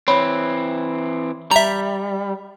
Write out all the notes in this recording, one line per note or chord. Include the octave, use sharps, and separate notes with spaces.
E3 C4 C#5 B5
G3 E5 A#5